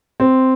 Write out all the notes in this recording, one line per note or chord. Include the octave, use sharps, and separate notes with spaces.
C4